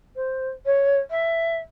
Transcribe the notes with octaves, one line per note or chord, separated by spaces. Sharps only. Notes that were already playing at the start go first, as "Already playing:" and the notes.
C5
C#5
E5